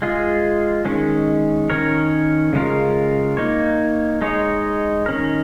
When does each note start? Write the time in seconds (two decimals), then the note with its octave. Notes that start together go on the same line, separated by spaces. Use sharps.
0.02 G#3 F4 G#4
0.85 D#3 G#3 C#4
1.70 D#3 C#4 A#4 C#5
2.53 C#3 G#3 C#4 F4 A#4
3.37 A#3 D#4 C#5
4.21 G#3 D#4 C#5
5.06 D#3 C#4 A#4